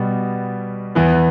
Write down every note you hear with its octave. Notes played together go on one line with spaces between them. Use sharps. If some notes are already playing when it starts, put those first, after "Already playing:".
Already playing: B2 G3 B3
E2 E3 B3